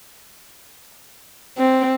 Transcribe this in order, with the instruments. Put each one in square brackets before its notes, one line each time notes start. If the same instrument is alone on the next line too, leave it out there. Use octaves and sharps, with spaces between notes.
[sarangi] C4